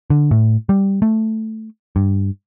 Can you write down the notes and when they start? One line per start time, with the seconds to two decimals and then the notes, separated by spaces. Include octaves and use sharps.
0.10 D3
0.31 A2
0.69 G3
1.02 A3
1.96 G2